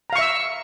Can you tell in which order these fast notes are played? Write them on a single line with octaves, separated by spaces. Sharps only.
A#5 F5 C#6 E5 E6